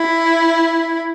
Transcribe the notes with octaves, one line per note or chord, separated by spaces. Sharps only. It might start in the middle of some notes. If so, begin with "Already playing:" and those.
Already playing: E4